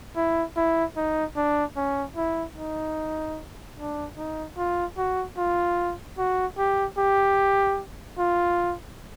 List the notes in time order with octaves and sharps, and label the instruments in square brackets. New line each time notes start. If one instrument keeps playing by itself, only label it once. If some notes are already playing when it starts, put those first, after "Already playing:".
[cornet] E4
E4
D#4
D4
C#4
E4
D#4
D4
D#4
F4
F#4
F4
F#4
G4
G4
F4